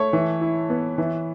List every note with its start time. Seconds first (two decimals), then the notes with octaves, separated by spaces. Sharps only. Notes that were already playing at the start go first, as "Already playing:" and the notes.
Already playing: A3 C#5
0.13 E3
0.41 E4
0.70 B3
0.98 E3